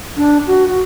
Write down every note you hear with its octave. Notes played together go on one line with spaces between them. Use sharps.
D4
F#4
F#4